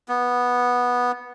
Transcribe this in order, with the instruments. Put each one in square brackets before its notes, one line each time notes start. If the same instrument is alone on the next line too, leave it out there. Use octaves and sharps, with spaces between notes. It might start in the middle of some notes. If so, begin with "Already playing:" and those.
[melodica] B3